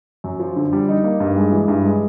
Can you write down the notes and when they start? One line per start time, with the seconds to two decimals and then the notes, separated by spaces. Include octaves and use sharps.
0.24 F#2
0.39 F3
0.56 D3
0.73 G3
0.89 D#4
1.04 A#3
1.20 G2
1.36 G#3
1.52 E3
1.68 G2
1.85 G#3